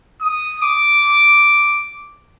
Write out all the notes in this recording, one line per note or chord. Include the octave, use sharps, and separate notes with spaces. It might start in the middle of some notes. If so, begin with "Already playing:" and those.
D#6
D6